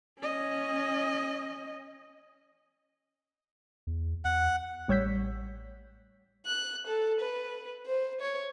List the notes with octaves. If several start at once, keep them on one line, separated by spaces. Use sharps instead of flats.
C#4 D#5
E2
E2 F#5
A1 G3 C#5 E6 G6 B6
F#6
A4
B4
C5
C#5